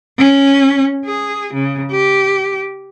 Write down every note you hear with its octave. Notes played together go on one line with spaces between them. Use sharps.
C#4
G#4
C#3
G4